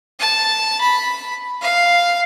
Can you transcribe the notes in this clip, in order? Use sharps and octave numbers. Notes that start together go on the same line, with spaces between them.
A5
B5
F5